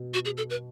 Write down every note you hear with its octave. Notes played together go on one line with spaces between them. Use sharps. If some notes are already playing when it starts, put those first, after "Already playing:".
Already playing: B2
F#4
G#4
A4
B4